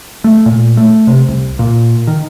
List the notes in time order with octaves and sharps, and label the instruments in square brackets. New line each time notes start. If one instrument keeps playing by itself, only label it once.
[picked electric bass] A3
A#2
A3
C3
C2
A#2
D#3